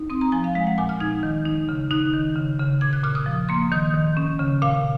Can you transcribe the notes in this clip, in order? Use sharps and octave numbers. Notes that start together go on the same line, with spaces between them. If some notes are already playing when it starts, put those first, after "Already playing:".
Already playing: D#4
C4 D#6
A#5
F3 G#5
F5
G#3 F5
F#5
A#2 G#5
F6
D#4 G#6
D#3
D#4
C#3
D#4 F#6
D#3
C#3
C#3
A#2 G#6
F#6
A#2 F6
D#6
F3
A#3 C6
D#3 D#6
D#3
C#4
C#3
A#2 F5